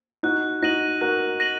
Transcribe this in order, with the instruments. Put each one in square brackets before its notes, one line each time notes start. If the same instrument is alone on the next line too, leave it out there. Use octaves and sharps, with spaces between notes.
[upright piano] D#4 F#4 [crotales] F#6
[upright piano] D#4 F#4 [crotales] A#6 D#7 F#7
[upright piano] F#4 A#4 [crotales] F#6
[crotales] A#6 D#7 F#7